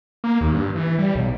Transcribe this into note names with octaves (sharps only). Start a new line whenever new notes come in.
A#3
D#2
G2
E3
G3
B1